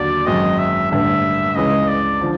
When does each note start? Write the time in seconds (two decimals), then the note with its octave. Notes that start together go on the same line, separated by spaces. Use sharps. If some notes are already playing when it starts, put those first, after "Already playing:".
Already playing: D#2 D3 F#3 D5
0.26 G#1 F#2 D#3 G#3 D#5
0.59 E5
0.91 A1 G2 D3 E5
1.55 C#2 C#3 E3 G#3 D#5
1.88 D5
2.21 D3 F3